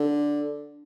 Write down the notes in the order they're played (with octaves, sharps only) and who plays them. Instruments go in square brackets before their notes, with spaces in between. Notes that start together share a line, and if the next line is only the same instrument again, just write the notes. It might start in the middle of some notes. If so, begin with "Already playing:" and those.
Already playing: [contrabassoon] D3